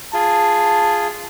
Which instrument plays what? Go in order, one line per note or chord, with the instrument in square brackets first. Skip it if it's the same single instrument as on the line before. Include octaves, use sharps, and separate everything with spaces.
[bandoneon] F4 G#4 [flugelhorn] A5